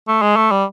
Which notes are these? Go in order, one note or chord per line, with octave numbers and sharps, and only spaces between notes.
A3
G#3
A3
G3